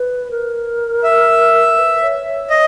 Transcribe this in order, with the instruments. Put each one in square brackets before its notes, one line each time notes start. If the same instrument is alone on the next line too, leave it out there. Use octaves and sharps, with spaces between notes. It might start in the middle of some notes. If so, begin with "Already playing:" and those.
Already playing: [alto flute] B4
A#4
[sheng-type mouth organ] E5
[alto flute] B4
C#5
C#5
[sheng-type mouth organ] D#5